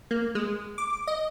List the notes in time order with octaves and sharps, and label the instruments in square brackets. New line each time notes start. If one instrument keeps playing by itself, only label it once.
[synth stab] A#3
G#3
D6
D#5